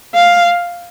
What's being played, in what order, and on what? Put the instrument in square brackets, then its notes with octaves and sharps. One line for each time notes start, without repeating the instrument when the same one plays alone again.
[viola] F5